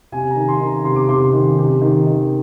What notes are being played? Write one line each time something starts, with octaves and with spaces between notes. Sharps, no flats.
C3 G#5
D#3 A#5
C6
D#3
A#5
C3 C6
D6
C3 C6
D#3
C3
D#3
D#3